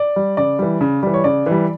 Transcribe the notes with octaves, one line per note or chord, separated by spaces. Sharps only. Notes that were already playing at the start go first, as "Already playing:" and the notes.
Already playing: D5
G3
C#3 D5
E3 G3
C#3
E3 G3
C#5
C#3 D5
E3 G3